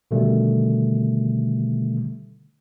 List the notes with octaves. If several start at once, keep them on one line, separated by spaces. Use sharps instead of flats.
B2 D3 D#3 G3 A3